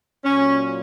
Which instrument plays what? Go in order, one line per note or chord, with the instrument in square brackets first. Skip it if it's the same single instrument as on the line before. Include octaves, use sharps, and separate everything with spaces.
[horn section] A#2 F#3 C#4